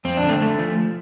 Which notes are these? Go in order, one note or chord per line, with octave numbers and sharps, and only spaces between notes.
F2 C4
D4
D3
A3 C4
D3 A3
F3